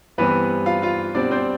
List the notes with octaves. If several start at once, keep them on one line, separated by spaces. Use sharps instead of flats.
G2 E3 G3 B3 C4 B4
F4 F5
F4 F5
B2 G3 C4 D4 D5
C4 C5